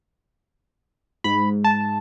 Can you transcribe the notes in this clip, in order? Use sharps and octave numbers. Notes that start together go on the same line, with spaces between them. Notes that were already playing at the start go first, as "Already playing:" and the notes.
G#2 B5
A5